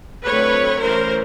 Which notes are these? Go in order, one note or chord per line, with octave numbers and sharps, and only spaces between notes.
D3 F#3 A3 C4 B4 C#5
E3 A3 C#4 A#4 C5